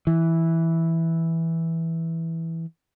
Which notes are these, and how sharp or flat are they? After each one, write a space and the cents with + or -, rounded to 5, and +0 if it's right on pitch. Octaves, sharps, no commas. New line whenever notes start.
E3 -5